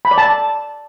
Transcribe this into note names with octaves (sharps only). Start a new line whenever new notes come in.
B5
D5
A5